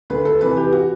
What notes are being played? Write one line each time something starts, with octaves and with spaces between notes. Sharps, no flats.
D2 B4
A4
C3 E3 B4
G4
F#4